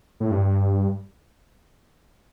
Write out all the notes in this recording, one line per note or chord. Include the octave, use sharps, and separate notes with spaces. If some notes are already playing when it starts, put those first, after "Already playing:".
A2
G2